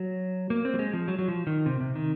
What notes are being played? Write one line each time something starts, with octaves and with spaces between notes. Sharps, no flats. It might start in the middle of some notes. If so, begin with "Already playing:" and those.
Already playing: F#3
A#3
C4
F#3
G#3
F3
F#3
F#3
F3
D#3
C3
C3
D#3